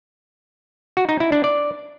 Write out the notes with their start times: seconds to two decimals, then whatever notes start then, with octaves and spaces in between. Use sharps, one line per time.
0.97 F#4
1.09 D#4
1.20 E4
1.32 D4
1.44 D5